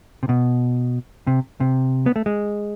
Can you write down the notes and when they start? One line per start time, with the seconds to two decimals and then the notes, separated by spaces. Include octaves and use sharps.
0.23 C3
0.29 B2
1.27 C3
1.60 C3
2.06 B3
2.16 A3
2.26 G#3